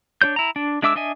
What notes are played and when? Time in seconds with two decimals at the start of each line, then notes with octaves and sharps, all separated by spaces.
0.22 D4 F4 C#5 G6
0.36 E4 A#5
0.56 D4
0.82 G#3 D4 E5 D6 E6
0.96 D4 D#5 E5 G#5